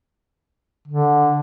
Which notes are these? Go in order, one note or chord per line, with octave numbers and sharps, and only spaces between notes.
D3